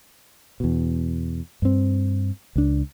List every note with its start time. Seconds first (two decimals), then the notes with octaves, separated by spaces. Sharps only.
0.60 E2 B2
1.62 G2 C4
2.56 C#2 D4